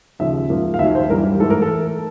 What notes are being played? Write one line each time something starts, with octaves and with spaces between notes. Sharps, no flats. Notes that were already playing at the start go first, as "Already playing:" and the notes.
D#2 C#3 F3 E5
G#2 F3 A#3
F5
D#2 D#3 F#3 E5
C5
G2 E3 G3 A#4
G#2 E3 A3 A4
A#4
A4